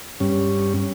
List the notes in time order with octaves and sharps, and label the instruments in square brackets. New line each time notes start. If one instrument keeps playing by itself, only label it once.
[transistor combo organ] G2 C#4